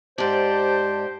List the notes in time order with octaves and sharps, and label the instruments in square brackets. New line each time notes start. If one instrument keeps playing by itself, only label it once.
[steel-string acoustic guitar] G#2 D5 [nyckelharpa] G4 [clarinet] C5 [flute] A5